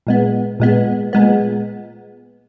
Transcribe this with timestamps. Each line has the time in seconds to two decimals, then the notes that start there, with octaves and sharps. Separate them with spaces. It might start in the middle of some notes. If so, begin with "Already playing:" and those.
0.07 A#2 G#3 B3
0.60 A#2 G#3 B3
1.13 A#2 G#3 B3